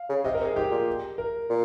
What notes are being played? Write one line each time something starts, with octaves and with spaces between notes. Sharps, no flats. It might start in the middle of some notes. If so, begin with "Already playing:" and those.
Already playing: F5
C#3
C3 D#5
A#4
C3
G#4
G#2 G4
A#2
A#4
A#2